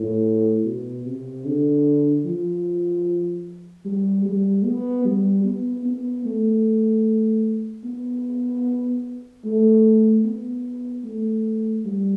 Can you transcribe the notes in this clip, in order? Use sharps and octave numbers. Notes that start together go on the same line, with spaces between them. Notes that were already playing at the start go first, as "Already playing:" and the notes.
Already playing: A2
B2
C3
D3
F3
G3
G3
B3
G3
B3
B3
A3
B3
A3
B3
A3
G3